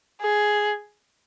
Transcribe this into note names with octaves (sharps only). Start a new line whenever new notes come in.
G#4